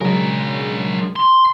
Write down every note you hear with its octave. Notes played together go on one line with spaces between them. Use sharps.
C#3 F#3 G#3 D4 A#4
C6